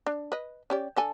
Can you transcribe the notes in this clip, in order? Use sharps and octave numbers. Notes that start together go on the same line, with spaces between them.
D4
B4 D#5
C#4 G4 D5
D3 A4 G#5